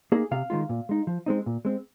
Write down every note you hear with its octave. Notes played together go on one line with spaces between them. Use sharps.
A#3 D#4 G#4
C3 F5
D#3 G#3 F4
A#2
G#3 D#4
F3
G#3 C4 D#4
A#2
G#3 C4